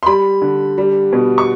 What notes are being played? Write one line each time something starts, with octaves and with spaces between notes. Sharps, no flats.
C6
G3 B5
D3
G3
B2
C#6